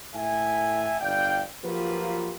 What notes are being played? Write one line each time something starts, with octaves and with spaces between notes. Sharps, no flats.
A2 E5 G#5
G1 D5 F5 G5
F3 F#3 A#3 F4 G4 B4